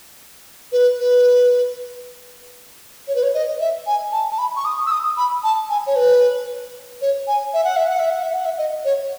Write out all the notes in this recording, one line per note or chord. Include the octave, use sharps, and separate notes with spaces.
B4
B4
C#5
B4
C#5
D#5
E5
G#5
A5
A5
B5
C#6
D#6
E6
D#6
B5
A5
G#5
C#5
B4
C#5
G#5
E5
F#5
E5
F#5
E5
F#5
E5
F#5
E5
D#5
C#5